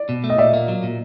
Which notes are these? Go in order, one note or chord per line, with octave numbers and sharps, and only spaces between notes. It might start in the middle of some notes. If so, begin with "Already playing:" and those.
Already playing: D5
B2
A3
D#5
A#2 D5 E5
A#3
F#3
A#2